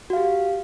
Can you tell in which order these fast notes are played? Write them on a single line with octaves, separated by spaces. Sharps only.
F#4 F5 G4